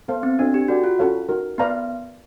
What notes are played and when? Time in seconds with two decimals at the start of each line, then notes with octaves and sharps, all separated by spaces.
0.08 B3 A4 C5 F5 A5
0.23 C4
0.39 D4 F#4 A4 C5 D#5 G5
0.54 G4
0.68 F#4 A4 D5 G5
0.84 F4
0.99 C#4 F#4 A4 C#5 F5
1.29 D#4 F#4 A#4
1.58 B3 B4 D5 F5 A#5